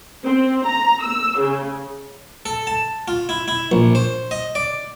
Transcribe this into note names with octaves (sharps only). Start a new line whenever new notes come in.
C4
A#5
E6
C#3
A4
A5
F4
E4
E4
A#1
C5
D#5
D5